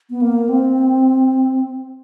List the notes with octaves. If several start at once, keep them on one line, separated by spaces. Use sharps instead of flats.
B3
A#3
C4